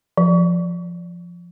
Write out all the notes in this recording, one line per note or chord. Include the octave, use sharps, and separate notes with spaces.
F3